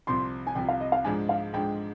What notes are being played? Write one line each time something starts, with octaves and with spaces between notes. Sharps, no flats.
C2 C3 F3 C6
G#5
C2 C3 F3 G5
F5
D#5
F5
G#2 F3 G#3 D4 G#5
F5
G#2 F3 G#3 D4 G5